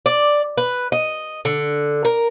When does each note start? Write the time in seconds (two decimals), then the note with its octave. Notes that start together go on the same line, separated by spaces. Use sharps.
0.06 D5
0.57 B4
0.92 D#5
1.45 D3
2.05 A#4